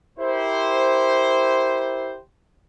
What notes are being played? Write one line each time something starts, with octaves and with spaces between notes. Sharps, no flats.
E4 G4 A#4 C5